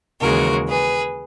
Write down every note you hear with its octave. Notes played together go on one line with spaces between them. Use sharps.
D#2 C#3 E3 G#3 F#4 A#4
G#4 B4